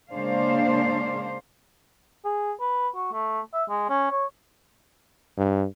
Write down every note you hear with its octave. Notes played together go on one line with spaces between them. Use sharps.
C#3 G#3 A#3 D4 C5 F5
G#4
B4
F#4
A3
E5
G#3
C#4
C#5
G2